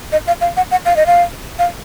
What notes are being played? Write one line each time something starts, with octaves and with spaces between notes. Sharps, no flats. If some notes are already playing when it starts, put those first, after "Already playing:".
D#5
F5
F5
F#5
F#5
F5
D#5
F5
F5